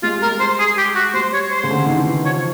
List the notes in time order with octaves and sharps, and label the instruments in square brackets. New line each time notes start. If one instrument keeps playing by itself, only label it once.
[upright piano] G#3 [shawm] F4
[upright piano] G3
[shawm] A#4
[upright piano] G#3
[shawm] C5
G#4
G4
F#4
[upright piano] G3 [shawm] C5
[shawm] C#5
C5
[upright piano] C#3
D3
D#3
E3
[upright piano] F3 [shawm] C#5